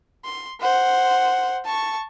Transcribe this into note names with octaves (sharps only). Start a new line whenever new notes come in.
C6
C5 F#5
A5 C#6